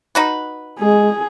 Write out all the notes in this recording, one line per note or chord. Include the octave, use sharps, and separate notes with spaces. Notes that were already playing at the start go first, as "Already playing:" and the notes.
D#4 F#4 B4
G#3 G#4